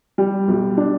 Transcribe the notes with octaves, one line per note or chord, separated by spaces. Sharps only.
G3
B1
D4